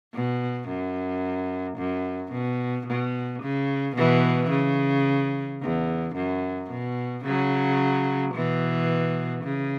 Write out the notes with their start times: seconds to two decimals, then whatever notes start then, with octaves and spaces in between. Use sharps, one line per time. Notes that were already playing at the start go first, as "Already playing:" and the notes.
0.14 B2
0.68 F#2
1.77 F#2
2.32 B2
2.86 B2
3.42 C#3
3.96 B2 E3
4.51 C#3
5.61 E2
6.16 F#2
6.70 B2
7.25 C#3 F#3
8.35 B2 E3
9.44 C#3